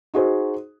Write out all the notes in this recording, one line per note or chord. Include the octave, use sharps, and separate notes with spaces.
D#4 F#4 G#4 C5